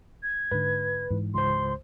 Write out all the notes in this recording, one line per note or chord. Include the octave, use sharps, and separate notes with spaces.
G#6
G#2 D3 B4
G#2 E3
C#2 C5 C6